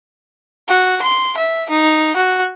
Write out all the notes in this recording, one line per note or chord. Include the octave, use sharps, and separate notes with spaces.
F#4
C6
E5
D#4
F#4